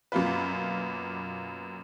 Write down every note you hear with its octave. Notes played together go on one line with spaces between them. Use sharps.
F#2 B2 A#3 F4 B4